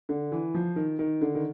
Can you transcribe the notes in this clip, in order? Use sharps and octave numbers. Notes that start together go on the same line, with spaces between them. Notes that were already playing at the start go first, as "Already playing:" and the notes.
D3
E3
F3
D#3
D#3
D3
D#3